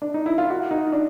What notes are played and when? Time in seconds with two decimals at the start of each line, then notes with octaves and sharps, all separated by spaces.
0.02 D4
0.14 D#4
0.26 E4
0.38 F4
0.50 F#4
0.71 D#4
0.92 D4